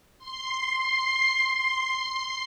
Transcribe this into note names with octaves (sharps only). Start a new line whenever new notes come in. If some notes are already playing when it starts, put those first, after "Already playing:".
C6 C7